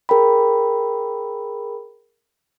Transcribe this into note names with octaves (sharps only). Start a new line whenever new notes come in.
G#4 A#4 G5 B5